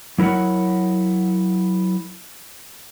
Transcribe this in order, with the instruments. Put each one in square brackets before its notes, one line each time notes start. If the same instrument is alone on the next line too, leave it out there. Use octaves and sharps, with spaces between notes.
[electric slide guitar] F#3 E4 A#4 C#5 F#5